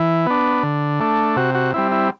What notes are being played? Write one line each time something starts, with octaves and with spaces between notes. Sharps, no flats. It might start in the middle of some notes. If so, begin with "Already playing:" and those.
Already playing: E3
B3 D4
D3
A3 D4
C3 F#4
F#4
G3 C4 E4
E4